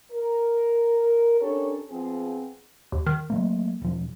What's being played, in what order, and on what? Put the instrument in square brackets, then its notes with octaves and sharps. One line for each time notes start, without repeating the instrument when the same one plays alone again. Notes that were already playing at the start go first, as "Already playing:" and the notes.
[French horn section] A#4
C#4 D4 G4 A4 A#4 C#5
F3 B3 C4 G#4
[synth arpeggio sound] D#2
D#3
[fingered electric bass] F#3 A3 A#3
E1 F3